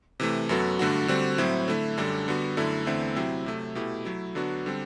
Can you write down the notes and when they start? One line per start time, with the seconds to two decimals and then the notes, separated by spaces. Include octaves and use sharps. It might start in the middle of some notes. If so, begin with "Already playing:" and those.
0.20 C3 E3 A3
0.49 F#2 F#3 B3 F#4 A4
0.79 G2 D3 A3 D4 F#4
1.08 D3 G3 C4 F#4
1.38 A2 F#3 C4 E4
1.68 D3 A3 E4
1.97 F#2 D3 G3 D4 A4
2.28 D3 G3 B3 F#4
2.57 F#2 D3 A3 E4
2.86 E2 D3 A3 C4 E4
3.16 C3 F#3 C4 E4
3.46 C3 F#3 A3
3.75 B2 A3 E4 G4
4.05 F#3 A3 E4
4.35 D3 F#3 B3 D4 F#4
4.66 D3 G3 C4